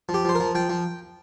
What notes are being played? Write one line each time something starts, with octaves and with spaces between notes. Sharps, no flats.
F3
G4
F3 C5
A#4
F3
F3 G5
F3